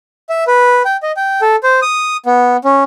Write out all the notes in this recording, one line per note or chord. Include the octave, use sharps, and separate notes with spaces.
E5
B4
G5
D#5
G5
A4
C5
D#6
B3
C#4